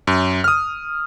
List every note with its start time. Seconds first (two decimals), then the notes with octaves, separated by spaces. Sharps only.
0.07 F#2
0.44 D#6 F6